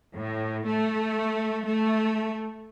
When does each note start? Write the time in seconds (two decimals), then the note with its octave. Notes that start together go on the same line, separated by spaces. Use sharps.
0.15 A2
0.66 A3
1.66 A3